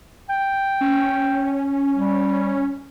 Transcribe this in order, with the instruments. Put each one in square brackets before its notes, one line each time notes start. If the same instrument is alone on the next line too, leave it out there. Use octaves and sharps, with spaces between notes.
[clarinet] G5
[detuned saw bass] C#4
[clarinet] G3